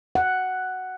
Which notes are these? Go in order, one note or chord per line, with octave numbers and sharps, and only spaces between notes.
F#5